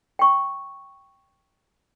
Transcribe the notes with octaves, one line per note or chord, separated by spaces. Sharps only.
G5 C#6